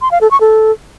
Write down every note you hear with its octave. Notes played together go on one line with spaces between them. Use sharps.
C6
F5
A4
C#6
A4